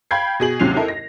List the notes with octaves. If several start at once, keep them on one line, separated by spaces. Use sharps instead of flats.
F5 G5 B5 G6 G#6 C7
B2 G#4 F#7
D#2 C3 F#3 C#4 C7 F7
D#4 E4 A4 A#4 D#5
A#6